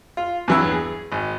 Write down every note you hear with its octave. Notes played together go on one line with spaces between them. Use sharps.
F4
E2 G2 F#3 E4 E6
G#4
G#1